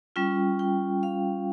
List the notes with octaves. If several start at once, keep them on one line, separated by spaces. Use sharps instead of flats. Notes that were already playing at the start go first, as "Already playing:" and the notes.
G3 C#4 F4 G5
G5
F5